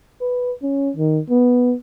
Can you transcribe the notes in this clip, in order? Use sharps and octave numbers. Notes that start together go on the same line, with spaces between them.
B4
C#4
D#3
B3